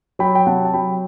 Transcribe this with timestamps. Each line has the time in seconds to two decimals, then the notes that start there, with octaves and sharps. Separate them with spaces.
0.19 F#3 G5 B5
0.35 G5
0.46 C3 F#5 A5
0.65 A5
0.74 F#3 G5 B5